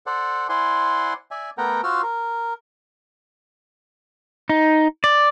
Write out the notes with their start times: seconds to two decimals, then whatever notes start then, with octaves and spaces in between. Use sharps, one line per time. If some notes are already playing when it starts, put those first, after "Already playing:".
0.07 A4 C5 D5 F#5
0.49 E4 C5 D5 F#5 G#5 C6
1.31 D5 E5 G#5
1.58 A3 B3 A#4 F#5 G5 A#5
1.84 F4 F#4 C5 E6 F6
2.03 A#4
4.49 D#4
5.04 D5